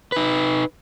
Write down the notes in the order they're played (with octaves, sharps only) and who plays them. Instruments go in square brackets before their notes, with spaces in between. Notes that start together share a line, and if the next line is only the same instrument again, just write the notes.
[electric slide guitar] D#4 B4